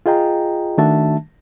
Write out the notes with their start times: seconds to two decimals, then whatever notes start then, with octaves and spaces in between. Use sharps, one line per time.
0.06 F4 G#4 D#5 G5 A#5
0.78 D#3 A3 D4 F#4 E5 A5